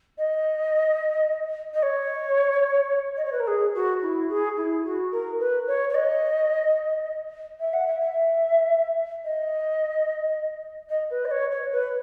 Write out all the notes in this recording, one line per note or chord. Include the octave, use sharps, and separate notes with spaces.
D#5
D#5
C#5
D#5
C#5
B4
A#4
G#4
F#4
E4
G#4
E4
F#4
A#4
B4
C#5
C#5
D#5
E5
F#5
E5
E5
D#5
D#5
B4
D#5
C#5
C#5
B4